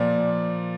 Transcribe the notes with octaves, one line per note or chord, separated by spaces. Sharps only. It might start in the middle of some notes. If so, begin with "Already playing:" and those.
Already playing: A#2 F3 D5